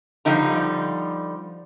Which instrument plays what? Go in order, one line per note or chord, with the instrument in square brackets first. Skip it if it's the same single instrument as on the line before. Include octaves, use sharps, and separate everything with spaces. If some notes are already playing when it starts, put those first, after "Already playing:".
[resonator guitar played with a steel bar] D3 F3 G3 D#4 A#5